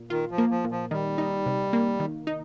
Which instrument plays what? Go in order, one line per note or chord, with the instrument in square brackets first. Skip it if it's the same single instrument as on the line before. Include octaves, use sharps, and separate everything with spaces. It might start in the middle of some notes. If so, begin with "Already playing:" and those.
Already playing: [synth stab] A#2
[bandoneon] D#3 [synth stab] F4
[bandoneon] F3
[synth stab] A#3
[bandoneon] F3
[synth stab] A#2
[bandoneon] F3
[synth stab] D#3 [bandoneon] G3
[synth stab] D#4
C3
A#3
D#3
D#4